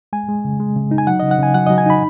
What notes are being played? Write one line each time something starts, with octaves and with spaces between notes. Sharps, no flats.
G#3 G#5
G#3
C#3
G#3
C#3
D#4
G#5
F#3 F#5
C#3 D#5
F#5
C#3 G#5
F#3 F#5
F#3 D#5
G#5
D#4 B5